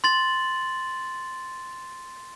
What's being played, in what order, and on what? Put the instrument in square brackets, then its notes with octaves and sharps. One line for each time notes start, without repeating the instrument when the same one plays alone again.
[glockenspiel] C6 A6 F#7